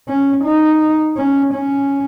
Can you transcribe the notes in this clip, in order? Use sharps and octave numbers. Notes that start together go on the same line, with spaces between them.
C#4
D#4
C#4
C#4